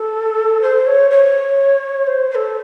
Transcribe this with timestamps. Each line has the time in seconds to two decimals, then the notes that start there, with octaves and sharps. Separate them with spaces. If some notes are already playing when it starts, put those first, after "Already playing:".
Already playing: A4
0.62 C5
0.87 C#5
1.11 C#5
2.07 C5
2.31 C5
2.35 A4